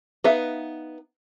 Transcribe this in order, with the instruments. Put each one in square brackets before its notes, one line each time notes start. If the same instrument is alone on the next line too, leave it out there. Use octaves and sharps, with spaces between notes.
[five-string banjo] B3 D#4 B4 E5 F5